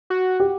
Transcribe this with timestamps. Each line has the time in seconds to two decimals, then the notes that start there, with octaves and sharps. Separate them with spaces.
0.10 F#4
0.40 G4